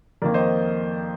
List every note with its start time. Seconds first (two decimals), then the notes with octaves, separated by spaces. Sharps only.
0.22 F2 D#3 A#3 A#4 D5
0.34 C5 D#5